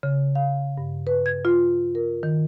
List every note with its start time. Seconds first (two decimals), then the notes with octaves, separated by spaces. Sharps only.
0.03 C#3
0.35 F5
0.78 G2
1.07 B4
1.26 G#6
1.45 F4
1.95 A#4
2.23 D#3